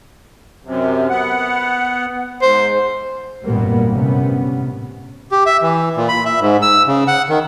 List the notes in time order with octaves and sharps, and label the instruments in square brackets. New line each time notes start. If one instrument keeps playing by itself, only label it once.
[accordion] F#2 C3
B3 F#5
[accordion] G#2 [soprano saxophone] C5
[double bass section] G#1 F#2 A#2 G3 A#3 B3
G1 A2 C3 B3 C#4
[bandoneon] G4
E5
E3
A#2
B5
E5
G#2
E6
C#3
F#5
D#3